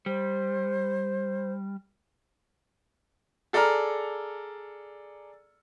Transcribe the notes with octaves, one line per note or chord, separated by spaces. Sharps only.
G3 C5
G#4 A4 D5 A#5 F6